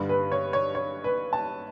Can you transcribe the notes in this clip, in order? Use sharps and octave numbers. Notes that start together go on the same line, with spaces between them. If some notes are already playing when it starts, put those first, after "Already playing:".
Already playing: G2 D3 G3
B4
C#5
C#5
C#5
B4
A5